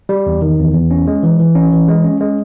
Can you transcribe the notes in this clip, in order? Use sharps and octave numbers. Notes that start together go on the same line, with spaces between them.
G3
E2
D#3
E2
E2
C#4
G#3
E3
E3
C#4
E3
G#3
C#4
G#3